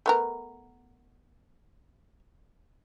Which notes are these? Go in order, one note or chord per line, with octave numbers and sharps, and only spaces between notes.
A3 B3 A#4